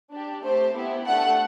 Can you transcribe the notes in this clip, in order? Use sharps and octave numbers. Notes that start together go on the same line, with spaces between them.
D4 G4
A3 C4 G4 C5
B3 E4 G4
A3 D4 A4 F#5